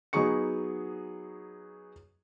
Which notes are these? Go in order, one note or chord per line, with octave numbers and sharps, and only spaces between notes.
F#3 B3 D#4 G#4 C#6 C#7